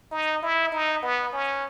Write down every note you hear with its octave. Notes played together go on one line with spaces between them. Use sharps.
D#4
E4
D#4
B3
C#4